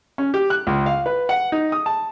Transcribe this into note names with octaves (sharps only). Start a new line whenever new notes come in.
C#4
G4
F#6
C#2
F5
B4
F#5
D#4
D#6
A5